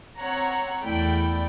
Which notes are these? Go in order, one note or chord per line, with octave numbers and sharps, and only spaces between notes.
C4 C#5 F#5 A#5
E2 A3 E4 D5 G5 B5